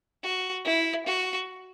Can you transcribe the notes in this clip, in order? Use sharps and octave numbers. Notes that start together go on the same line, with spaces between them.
F#4
E4
F#4